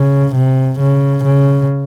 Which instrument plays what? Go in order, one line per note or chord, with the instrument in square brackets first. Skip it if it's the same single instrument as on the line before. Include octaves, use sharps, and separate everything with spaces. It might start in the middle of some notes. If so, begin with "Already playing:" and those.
Already playing: [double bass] C#3
C3
C#3
C#3